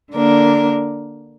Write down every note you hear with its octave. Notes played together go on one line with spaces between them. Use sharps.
D3 A#3 D4 A#4